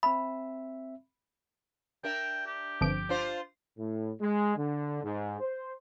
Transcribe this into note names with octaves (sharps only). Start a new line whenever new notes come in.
C4 E5 B5
D4 A#4 E5 G5
G4
G1 F2 D7
D4 F4 C5
A2
G#3
D3
G#2
C5